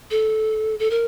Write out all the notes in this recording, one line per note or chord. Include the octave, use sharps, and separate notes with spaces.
A4
A4
A#4